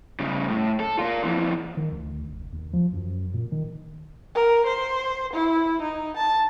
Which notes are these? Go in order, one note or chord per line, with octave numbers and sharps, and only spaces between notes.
C#3 G3
A2
A4
A#3 F4
F2 E3
D#3
D2
F1
D#2
F3
F#2
A#2
D#3
A#4
C5
E4
D#4
A5